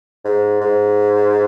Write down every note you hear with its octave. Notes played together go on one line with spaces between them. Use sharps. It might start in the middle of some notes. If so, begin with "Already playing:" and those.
G#2
G#2